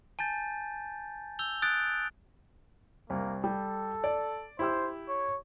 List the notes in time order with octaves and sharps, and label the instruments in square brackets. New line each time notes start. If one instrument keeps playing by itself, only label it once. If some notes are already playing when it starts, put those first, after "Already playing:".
[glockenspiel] G#5 A5 G6 A6
E6 G6 F7 G7
D#6 F#6 G6 A6 D7
[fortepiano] C2 [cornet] A#3
[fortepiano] G3 [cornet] A4
[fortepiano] D5
[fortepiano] E4 G4 E6 [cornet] C5
[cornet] C#5